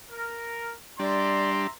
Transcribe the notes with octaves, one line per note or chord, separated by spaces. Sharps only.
A#4
G3 D4 D5 E5 A#5 C6